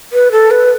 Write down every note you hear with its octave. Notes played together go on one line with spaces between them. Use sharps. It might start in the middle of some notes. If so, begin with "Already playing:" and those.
B4
A4
B4